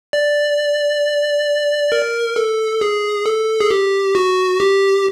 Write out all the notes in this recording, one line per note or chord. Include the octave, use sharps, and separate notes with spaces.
D5
A#4
A4
G#4
A4
G#4
G4
F#4
G4